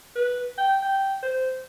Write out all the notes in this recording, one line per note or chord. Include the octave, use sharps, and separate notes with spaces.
B4
G5
G5
C5